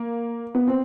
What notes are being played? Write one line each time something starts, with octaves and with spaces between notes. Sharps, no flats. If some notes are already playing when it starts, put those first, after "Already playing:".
Already playing: A#3
B3
C4